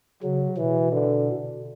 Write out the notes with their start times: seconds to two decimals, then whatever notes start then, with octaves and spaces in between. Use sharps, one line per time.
0.23 C#3 F#3
0.57 B2 E3
0.92 D3